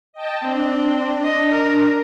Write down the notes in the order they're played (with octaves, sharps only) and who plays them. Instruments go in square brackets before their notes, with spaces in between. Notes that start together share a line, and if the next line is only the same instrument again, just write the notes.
[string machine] D#5 G5 A5
[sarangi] C4 [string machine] D4
[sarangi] D#5
A#4